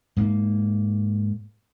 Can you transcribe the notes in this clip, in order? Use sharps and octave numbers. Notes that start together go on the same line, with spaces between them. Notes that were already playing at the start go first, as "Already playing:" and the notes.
G#2 A#3